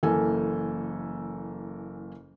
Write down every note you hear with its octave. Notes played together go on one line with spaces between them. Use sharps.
F#1 E3 A#3 A4 G#5